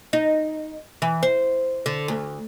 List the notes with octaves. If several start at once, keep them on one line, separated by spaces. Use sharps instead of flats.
D#4
E3
C5
D3
D2